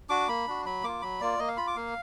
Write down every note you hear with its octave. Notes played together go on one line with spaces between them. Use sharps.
D4 F#4 D6
A#3 B5
D4 F#4
F#3 B5
A#3 F4 D6
F#3 B5
A#3 F4 D5
A#3 D#5
F5
F4 B5
D6
A#3 F5